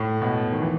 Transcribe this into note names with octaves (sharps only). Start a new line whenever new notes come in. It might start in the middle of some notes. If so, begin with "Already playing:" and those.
Already playing: A2
B2
D#3
E3